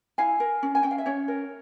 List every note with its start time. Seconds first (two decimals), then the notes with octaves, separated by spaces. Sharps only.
0.18 E4 F5 G#5
0.40 A#4
0.63 C#4
0.75 G#5
0.83 C#4 G5
0.91 F5
0.98 E5
1.06 C#4 C#5
1.28 A#4